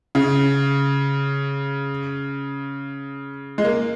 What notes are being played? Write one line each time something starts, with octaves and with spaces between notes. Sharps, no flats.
C#3
G#3
A#3